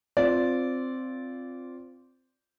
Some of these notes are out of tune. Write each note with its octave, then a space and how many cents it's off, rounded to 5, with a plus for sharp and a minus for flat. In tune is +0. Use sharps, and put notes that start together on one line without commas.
C4 -5 F4 +0 D5 -15